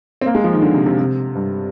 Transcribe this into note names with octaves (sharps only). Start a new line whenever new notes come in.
C4
A#3
G#3
F3
D#3
D3
C3
C3
C3
G2